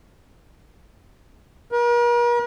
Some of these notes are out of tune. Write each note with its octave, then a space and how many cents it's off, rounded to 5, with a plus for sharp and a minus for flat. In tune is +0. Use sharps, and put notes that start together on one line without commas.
A#4 +45